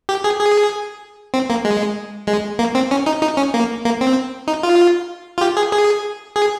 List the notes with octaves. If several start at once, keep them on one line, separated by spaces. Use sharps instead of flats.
G4
G#4
G#4
C4
A#3
G#3
G#3
A#3
C4
C#4
D#4
D#4
C#4
A#3
A#3
C4
D#4
F4
F4
G4
G#4
G#4
G#4